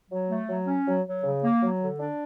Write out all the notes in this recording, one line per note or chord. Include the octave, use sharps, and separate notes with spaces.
F#3
A3
F#3
C#4
F#3
F#3
C#3
A#3
F#3
D3
D4